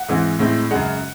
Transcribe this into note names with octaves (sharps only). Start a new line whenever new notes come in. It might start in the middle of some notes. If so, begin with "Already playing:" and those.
Already playing: F#5
G#2 E3 G#3 C4
A2 G#3 C4
F#2 C#3 G#3 F#5